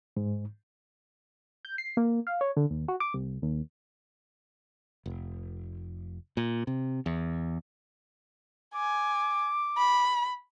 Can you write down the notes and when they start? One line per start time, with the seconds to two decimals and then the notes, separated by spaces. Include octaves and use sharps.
0.17 G#2
1.65 G6
1.78 C7
1.97 A#3
2.27 F5
2.41 C#5
2.57 D3
2.70 D#2
2.88 F#4
3.00 D6
3.14 C2
3.42 D#2
5.06 F1
6.37 A#2
6.67 C3
7.06 E2
8.75 G#5 D6
9.77 B5